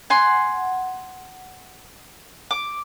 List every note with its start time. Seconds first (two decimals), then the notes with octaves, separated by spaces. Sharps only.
0.10 F#5 G#5 C6
2.51 D6